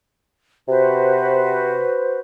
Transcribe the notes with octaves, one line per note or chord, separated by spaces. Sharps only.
C3 F#4 B4 C5